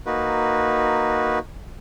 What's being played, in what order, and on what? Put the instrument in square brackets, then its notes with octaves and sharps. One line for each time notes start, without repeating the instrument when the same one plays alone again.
[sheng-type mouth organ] A#3 D#4 F#4 B4